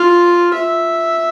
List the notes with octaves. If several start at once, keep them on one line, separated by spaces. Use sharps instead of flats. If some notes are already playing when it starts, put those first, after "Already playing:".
Already playing: F4
E5